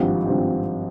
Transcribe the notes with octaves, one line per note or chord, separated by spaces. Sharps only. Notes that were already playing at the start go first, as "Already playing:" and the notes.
Already playing: G#1 G2 F3 C4 G4
G#1 G2 F3 C4 G4